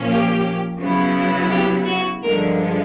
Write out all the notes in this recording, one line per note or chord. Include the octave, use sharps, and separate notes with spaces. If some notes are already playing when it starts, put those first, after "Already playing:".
Already playing: A#2 F3 A#3 C#4
G4
C#3 F#3 B3 E4
G4
F#4
G2 D3 F3 G#3 A#4